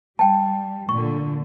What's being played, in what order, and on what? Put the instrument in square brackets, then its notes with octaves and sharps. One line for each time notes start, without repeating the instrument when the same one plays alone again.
[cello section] G3 [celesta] G5 A5
[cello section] A#2 D3 [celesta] C#6